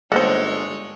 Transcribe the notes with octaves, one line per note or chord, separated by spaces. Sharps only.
G1 G#3 A#3 D#4 A4 C5 C#5 F#5